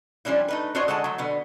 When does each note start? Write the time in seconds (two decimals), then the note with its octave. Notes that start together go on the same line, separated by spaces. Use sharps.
0.25 F3 G3 C#4 D4 E4
0.48 A3 D#4 B4
0.75 D4 F4 F#4 C5 C#5 D#5
0.88 D3 G#3 D#5 F#5 A5
1.04 F#3 A3
1.18 B2 D3 B3